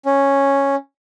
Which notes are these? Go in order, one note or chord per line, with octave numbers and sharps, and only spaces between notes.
C#4